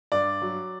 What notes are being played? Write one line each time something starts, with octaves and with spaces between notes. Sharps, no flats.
G2 D5
F#3